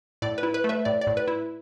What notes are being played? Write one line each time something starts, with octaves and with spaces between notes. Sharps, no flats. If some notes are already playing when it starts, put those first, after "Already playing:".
A2 D5
B4
E4
B4
A3
B4 E5
A2 D5
D5
A2
B4
E4